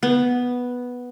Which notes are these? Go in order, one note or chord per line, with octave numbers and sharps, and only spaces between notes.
B3